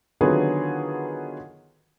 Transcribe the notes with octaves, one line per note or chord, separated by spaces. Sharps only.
D3 D#3 F#3 B3 F4 G#4